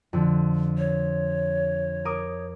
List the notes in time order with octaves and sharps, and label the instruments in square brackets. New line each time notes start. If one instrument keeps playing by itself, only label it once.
[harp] F2 D3
[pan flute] C#5
[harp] A#4 D6 D#6